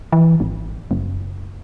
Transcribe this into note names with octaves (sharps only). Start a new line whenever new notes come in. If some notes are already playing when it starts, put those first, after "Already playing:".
E3
G#1
F#1